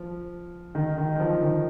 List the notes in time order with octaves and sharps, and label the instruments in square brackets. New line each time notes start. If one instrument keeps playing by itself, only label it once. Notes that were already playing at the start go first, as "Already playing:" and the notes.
Already playing: [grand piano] F3
D#3
D#3
D#3
F3
D#3